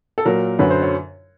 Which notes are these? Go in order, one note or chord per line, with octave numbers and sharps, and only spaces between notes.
A4
A#2 F#3 A#4
F#2 D3 F#3 B4
C5
C#5